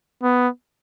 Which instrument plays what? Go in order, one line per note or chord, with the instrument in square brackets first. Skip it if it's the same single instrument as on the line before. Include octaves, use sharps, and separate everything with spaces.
[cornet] B3